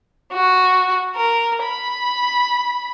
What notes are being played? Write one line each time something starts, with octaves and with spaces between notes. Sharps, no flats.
F#4
A#4
B5